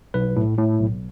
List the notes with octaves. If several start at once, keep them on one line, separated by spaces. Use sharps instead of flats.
B1 B4
A2
A2
B1